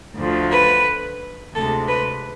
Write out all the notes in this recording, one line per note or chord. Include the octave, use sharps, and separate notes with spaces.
D2 D3 F3 A3
B4
D2 C3 G#3 A4
B4